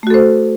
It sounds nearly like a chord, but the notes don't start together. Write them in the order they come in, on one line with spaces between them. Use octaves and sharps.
A3 F#4 A4 C5